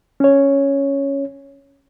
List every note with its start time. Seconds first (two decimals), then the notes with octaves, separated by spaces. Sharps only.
0.20 C#4 C#5